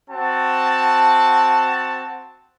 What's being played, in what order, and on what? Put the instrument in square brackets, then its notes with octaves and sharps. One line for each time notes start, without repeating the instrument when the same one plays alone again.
[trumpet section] C4 F#4 A5